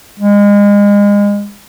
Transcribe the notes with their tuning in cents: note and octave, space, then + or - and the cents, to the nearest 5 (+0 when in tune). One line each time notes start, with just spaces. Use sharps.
G#3 -30